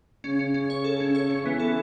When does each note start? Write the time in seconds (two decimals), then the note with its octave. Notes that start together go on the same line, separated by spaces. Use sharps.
0.24 C#3 C#4
0.39 C#4
0.54 C#4
0.70 C#5
0.84 A4
1.00 C#4
1.15 C#5
1.30 C#4
1.45 E3 B3
1.60 A4